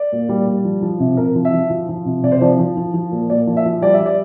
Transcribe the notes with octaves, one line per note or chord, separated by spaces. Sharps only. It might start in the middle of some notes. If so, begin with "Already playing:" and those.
Already playing: D5
A#2
G3
G3
F3
F3
C3
C3 A#4
F3
E5
F3
F3
F3
C3
C3 D5
C5
F3 D5
F3
F3
F3
A#2
A#2 D5
F3
E5
F3
G3 D5
E5
G3
D5